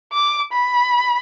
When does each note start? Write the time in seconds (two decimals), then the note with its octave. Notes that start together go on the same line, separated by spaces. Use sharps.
0.13 D6
0.52 B5